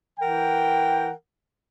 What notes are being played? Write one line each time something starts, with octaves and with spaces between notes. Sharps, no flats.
E3 A#4 F#5 G5